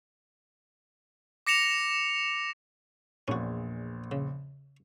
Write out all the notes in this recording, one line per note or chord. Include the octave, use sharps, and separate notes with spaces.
D6 A#6 C#7 E7 F7
A#1 E2 A#2 C#4 F#4
C#3